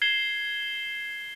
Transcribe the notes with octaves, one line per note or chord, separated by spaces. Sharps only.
G#6 C7 E7 G7